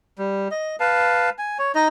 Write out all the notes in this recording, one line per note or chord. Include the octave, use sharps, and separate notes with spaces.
G3
D#5
B4 F5 A5
G#5
C#5
D#4 D#5